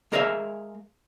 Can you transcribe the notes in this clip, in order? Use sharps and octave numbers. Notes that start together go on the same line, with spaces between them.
G#3 G#4 A#4 D5 E5 F5